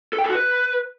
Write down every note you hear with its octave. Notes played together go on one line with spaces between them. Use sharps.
A4
G5
A4
F#4
B4